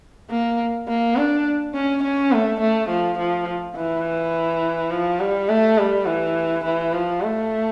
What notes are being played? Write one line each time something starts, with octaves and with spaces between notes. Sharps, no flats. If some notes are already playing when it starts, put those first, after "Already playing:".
A#3
A#3
D4
C#4
C#4
A3
A3
F3
F3
E3
F3
G3
A3
G3
E3
E3
F3
A3